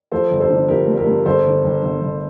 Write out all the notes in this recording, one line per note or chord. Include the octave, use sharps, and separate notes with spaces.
F3 A4 C5
G1
A4 C5
D3
F3 G4 A#4
G2
G4 A#4
G2
G1 A4 C5
D3
G1
G1
G1